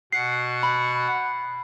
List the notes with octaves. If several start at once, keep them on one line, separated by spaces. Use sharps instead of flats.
B2 F#5 F#6 C7
B5